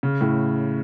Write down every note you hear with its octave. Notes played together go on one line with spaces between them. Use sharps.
C#3
A2